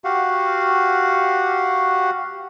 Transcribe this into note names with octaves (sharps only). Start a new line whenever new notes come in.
F#4 G4 F5 F#5